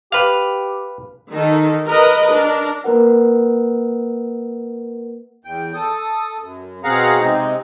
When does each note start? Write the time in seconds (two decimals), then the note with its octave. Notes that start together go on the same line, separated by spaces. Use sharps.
0.12 G4 B4 F5
1.30 D#3 D#4 A4
1.87 A#4 B4 D#5
2.32 D4 A#4
2.84 A#3 A#4 B4 F#5
5.45 E2 G5
5.74 A4 D#6
6.40 F#2
6.84 B2 C4 G#4 F5 F#5 A#5
7.20 C3 G#3 C4 D#4